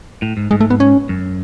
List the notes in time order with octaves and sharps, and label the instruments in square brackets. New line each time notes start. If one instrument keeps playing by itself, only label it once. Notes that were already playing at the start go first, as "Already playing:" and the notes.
[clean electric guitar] A2
G#2
[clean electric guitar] G#2 [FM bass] G#3
[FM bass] A3
B3
C#4
[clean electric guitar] F#2